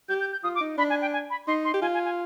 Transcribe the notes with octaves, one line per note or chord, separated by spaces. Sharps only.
G4 G6
G6
G6
F4 D#6
D6
D#4
D4 B5
G#5
G5
G#5
B5
D#4 C6
C6
G4
F4 G#5
G#5
G#5